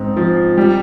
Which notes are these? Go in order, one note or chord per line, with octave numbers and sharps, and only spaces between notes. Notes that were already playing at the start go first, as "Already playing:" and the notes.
Already playing: G#2 C4
F3
G3